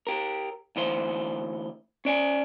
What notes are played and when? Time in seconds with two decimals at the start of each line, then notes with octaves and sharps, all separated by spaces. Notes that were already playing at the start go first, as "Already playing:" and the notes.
0.07 G4 A#4
0.76 D2 E3 C5
2.05 C#4 D5 G#5